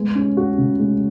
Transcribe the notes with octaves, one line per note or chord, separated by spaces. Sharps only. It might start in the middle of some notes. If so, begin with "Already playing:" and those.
Already playing: G#3 B3
C#4
F#4
C#3
G#3